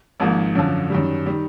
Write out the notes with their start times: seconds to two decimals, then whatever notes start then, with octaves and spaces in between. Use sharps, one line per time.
0.20 G#1 G#2 F3 A#3
0.56 F#2 D3 F3
0.90 F#2 D#3 G3
1.26 D#3 G3